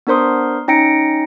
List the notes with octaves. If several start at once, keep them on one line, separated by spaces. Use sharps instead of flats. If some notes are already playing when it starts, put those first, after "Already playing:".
B3 D4 A#4 C5 C6 D#6
C#4 D#4 G5 A#6 C#7 D7